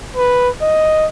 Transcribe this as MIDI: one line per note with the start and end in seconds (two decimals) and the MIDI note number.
0.17 0.49 71
0.62 1.06 75